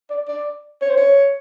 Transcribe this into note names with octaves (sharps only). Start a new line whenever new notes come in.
D5
D5
C#5
C5
C#5